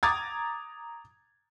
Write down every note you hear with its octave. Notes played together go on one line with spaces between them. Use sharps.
A#5 D6 D#6 G#6 A6